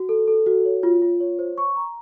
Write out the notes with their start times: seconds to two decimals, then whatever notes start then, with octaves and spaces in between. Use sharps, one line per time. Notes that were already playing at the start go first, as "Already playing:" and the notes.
Already playing: F#4
0.09 A4
0.28 A4
0.46 F#4
0.65 C#5
0.83 F4
1.02 F4
1.20 C#5
1.39 C5
1.58 C#6
1.76 A#5